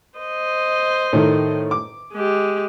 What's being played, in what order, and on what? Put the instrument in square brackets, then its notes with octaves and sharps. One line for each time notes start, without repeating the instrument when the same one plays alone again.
[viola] C5 D#5
[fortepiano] A2 D#3 A3
D6
[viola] G#3 G4